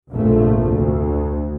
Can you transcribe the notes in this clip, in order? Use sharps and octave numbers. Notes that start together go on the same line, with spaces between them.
F1 A#1 G#2 F3 A3
D2